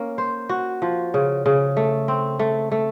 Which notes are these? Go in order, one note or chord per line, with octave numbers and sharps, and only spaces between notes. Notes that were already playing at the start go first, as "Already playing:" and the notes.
Already playing: A#3 C#4
C5
F#4
F3
C#3
C#3
A3
C4
A3
A3